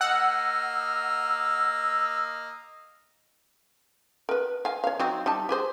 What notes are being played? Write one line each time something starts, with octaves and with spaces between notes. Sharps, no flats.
A#3 D#5 F#5 E6 F6
A#4 B4
F5 G#5
C#5 F5
F#3 C4 D#4
G3 D#4 A5
G4 G#4 C5